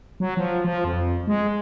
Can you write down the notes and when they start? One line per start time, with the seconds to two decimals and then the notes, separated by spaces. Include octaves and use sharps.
0.20 F#3
0.37 F3
0.65 F3
0.84 F2
1.27 G#3